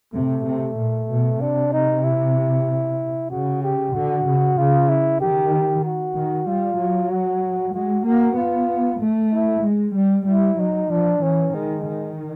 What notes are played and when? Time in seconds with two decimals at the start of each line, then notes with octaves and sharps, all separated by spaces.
0.14 C3 A3
0.45 C3
0.77 A#2
1.09 B2
1.40 C3 D4
1.73 D#4
2.04 E4
3.30 C#3 F#4
3.63 G4
3.94 D3 F#4
4.25 C#3
4.57 C#3 F4
4.89 E4
5.20 D#3 G4
5.84 F#4
6.16 D#3
6.47 G3 F4
6.79 F#3
7.10 F#4
7.74 G#3 F#4
8.06 A#3 F#4
8.37 B3 F4
9.01 A3
9.33 E4
9.64 G#3
9.95 G3
10.27 G3 E4
10.59 F#3 D#4
10.91 F3 D4
11.22 E3 C#4
11.54 D#3 G#3
11.86 D#3